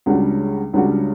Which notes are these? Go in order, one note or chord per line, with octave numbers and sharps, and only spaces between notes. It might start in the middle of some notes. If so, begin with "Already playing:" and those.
C#2 C#3 G3 D4 F#4
C#2 C#3 G3 D4 F#4